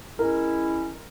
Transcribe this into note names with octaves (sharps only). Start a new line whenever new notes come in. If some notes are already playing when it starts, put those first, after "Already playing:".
G#3 C#4 E4 A#4